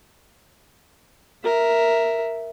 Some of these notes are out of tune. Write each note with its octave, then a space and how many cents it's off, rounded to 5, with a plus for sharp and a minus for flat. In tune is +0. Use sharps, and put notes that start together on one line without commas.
A#4 +0 E5 +0